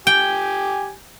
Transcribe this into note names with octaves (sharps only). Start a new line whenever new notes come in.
G4 G5 G#5